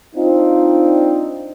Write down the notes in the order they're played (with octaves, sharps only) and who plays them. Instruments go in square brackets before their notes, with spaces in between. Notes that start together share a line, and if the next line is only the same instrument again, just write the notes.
[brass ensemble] C4 D4 D#4 F4